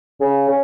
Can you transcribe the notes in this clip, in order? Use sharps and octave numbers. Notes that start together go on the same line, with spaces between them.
C#3
C#4